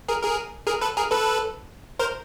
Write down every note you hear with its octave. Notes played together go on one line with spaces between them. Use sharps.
G#4 A#4
G#4 A#4
G#4 A#4
A4 B4
G#4 A#4
A4 B4
A#4 C5